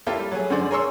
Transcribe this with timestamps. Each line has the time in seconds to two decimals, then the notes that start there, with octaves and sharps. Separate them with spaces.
0.07 A#3 E4 F4 G4 A4
0.19 G3
0.32 F#3 A3 G#4
0.50 F#2 D3 G#4 C5 D5
0.71 G#4 A#4 C#5 C6 C#6 E6